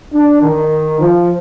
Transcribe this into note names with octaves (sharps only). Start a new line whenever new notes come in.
D4
D#3
F3